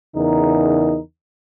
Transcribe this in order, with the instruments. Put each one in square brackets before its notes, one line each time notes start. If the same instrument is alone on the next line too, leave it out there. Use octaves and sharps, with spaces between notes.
[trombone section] E2 C#3 D#4 A#4